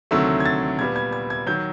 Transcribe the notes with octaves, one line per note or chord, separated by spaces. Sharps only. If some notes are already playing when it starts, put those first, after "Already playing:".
D2 C3 D#3 F#3 A3 E6
G#6
A6
A#2 G3 B3 G#6
G#6
G#6
G#6
D#3 F#3 G6